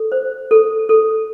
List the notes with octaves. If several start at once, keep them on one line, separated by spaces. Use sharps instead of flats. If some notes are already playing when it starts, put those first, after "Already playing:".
Already playing: A4
C5
A4
A4